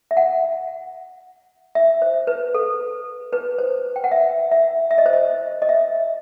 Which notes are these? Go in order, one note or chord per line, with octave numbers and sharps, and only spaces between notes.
E5
F#5
E5
C5
B4
A4
B4
C5
G5
F#5
E5
E5
E5
D#5
C5
D#5
D#5
E5